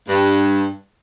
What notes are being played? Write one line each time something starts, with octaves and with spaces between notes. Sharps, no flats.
G2